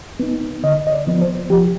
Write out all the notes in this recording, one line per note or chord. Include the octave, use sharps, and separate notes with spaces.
B3 D#4
D3 D#5
D#5
D5
F3 B3
C5
F3 G4